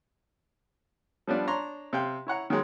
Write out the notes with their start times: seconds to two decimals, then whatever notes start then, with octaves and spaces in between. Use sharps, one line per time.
1.27 F3 G3 B3 D4
1.47 D4 C#5 A#5 C6
1.93 C3 F5 G5
2.27 E4 C#5 F#5 A#5
2.50 D#3 F#3 G#3